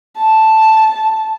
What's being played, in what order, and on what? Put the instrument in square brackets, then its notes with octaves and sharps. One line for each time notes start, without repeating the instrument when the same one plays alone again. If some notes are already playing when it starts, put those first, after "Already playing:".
[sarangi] A5